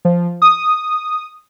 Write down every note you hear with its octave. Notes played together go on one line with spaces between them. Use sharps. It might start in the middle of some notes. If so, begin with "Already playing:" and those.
F3
D#6